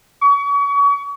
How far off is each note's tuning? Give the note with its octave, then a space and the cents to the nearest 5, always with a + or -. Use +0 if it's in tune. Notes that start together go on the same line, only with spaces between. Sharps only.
C#6 +35